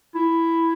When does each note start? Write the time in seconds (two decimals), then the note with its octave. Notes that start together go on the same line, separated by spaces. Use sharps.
0.15 E4